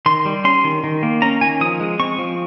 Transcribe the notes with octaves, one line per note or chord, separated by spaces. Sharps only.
D#3 C6
G3
C#4 C6
D#3
D#3
A#3
C#4 A#5
D#3 G#5
F3 D#6
G#3
C4 C#6
F3